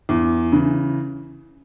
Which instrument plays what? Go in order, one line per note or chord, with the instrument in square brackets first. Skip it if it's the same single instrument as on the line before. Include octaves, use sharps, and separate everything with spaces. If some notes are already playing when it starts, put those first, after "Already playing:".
[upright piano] E2
C#3 E3